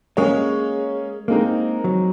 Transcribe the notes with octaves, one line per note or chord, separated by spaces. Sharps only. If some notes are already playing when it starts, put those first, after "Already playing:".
G#3 A#3 C#4 G#4 C#5
G#3 A#3 C4 D#4 A#4
F#3